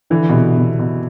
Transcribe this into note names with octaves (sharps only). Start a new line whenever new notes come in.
D3 E3
B2
C3
B2
B2